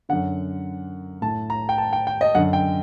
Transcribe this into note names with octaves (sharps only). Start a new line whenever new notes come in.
F#2 D3 F#5
A2 A5
A#5
G5
A5
G5
G5
D#5
F#2 D3 F#5
G5